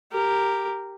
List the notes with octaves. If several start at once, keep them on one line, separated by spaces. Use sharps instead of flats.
G4 A#4